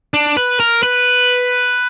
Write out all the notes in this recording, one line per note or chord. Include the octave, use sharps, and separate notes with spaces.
D4
B4
A#4
B4